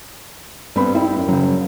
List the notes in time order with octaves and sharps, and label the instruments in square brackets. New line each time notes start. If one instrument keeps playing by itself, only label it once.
[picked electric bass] G2 [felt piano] B3 C4 B5
[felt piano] E4 G5
F#2
[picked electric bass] C#3 F#3